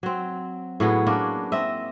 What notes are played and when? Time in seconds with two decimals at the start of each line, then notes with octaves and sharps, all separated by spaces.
0.03 F#3 C4
0.80 A2 F#3 B3 G#4
1.06 A#3 C#4 D4 B4
1.52 C4 D#5 E5